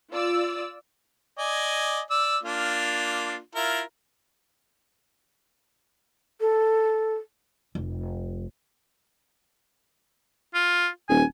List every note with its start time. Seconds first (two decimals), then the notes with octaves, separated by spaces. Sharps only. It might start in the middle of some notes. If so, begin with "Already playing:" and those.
0.12 F4 D5 E6
1.38 D5 D#5 G#5
2.10 D5 E6
2.43 A#3 D4 F4
3.55 E4 F4 A#4
6.41 A4
7.75 F1
10.54 F4
11.09 D#1 G#5